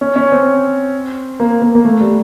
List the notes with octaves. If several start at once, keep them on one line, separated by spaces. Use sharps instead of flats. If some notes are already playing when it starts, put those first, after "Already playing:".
C#4
C#4
C4
A#3
A#3
A#3
A3
G3